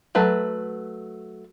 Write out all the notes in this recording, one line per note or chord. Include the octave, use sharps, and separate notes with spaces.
F#3 A3 B4